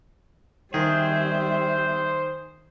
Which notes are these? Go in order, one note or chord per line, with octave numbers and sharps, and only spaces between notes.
D#3 G3 G#4 C5 E5